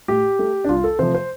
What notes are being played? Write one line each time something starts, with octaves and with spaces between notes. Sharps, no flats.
A2 G4
A3
D4
C2 F4
A4
C3 F3 A3 C5
C5